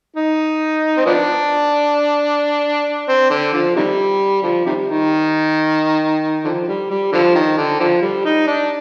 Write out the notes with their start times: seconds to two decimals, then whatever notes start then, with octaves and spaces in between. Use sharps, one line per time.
0.16 D#4
0.97 C4
1.06 F3 B3 D4
3.09 C4
3.30 D3
3.53 D3 F3
3.76 C3 D#3 G3
4.43 D3 F3
4.66 C3 D#3 G3
4.88 D#3
6.44 D3 F3
6.67 G3
6.90 G3
7.13 D3 F3
7.35 D#3
7.57 D3
7.80 D3 F3
8.02 G3
8.25 D#4
8.47 D4